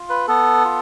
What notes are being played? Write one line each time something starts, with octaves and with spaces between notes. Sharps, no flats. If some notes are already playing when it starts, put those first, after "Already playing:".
Already playing: F4
B4
B3 A4
F4